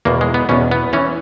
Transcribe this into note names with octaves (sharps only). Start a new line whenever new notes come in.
E2 B2 A#3
G#3
B3
E2 B2 C#4
B3
E3 C#4